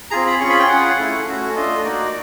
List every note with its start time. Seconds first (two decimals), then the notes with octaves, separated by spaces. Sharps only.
0.11 C4 F4 G#4 A#5
0.26 B5
0.40 C#4 F4 G#4 C#6
0.49 B5
0.59 G5
0.69 C#4 F4 G#4 F#5
0.98 A3 C#4 E4
1.26 A3 C#4 F#4
1.55 A3 D4 F4 D#5
1.84 A#3 D#4 F#4 D5